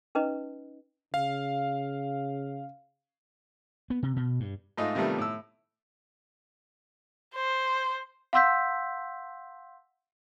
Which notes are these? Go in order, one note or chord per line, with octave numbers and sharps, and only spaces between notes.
C#4 D#4 B4 D#5
C#3 F5
B3
C3
B2
G2
G#2 A3 D#4 F4
C3 D#3 F3 G3 A3 B3
A2 E6
C5
F5 F#5 C6 E6 G6 B6